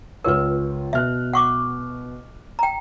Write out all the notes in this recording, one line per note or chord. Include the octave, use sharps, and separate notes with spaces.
C#2 F4 A#4 B4 C#5
B2 E5 F6 F#6
F#5 C#6 D6
G5 A#5